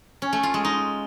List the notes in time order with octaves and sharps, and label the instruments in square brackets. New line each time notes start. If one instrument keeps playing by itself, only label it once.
[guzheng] C#4
A3
F4
G#3
D#4